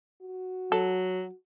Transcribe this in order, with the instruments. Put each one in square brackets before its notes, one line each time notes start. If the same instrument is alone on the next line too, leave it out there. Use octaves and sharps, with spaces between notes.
[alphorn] F#4
[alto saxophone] F#3 [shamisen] A4